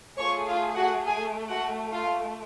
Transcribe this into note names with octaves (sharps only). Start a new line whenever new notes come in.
A3 F4 G#4 C#5 C#6
F4 F5
F#4 F#5
G#4 G#5
F#4 F#5
F4 F5